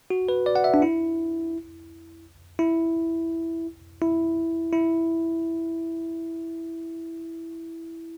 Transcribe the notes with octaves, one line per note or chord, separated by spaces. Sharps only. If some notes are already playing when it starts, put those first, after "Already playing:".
F#4
B4
D5
F#5
E5
D4
E4
E4
E4
E4